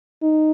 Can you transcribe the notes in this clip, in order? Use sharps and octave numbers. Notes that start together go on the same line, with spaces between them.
D#4